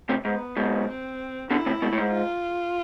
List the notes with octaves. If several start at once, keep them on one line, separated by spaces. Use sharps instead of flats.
A2 C3
G#2 B3
G#2 B2
C4
B2 D3 E4
A2 C3
G#2 B2
A2
G#2
F4